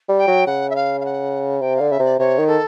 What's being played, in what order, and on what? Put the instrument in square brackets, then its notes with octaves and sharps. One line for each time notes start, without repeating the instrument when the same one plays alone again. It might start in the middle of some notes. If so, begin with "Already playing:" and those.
[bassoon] G3
[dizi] G5
[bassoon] F#3
[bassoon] C#3 [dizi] F#5
[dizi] E5
F5
F5
F#5
[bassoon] C3 [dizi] G5
[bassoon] D3 [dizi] F5
[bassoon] C#3 [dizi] E5
[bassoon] C3 [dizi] D5
[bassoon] C3 [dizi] C#5
[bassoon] D#3
[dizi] A4